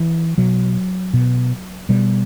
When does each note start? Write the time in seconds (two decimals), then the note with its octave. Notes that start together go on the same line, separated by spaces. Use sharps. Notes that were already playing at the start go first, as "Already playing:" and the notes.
Already playing: E3
0.38 B2 F#3
1.14 B2
1.89 B2 G3